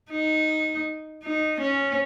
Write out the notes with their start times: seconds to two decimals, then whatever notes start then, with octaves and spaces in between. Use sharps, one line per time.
0.11 D#4
1.23 D#4
1.61 C#4